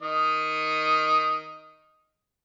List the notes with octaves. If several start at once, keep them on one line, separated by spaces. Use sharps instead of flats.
D#3 D#5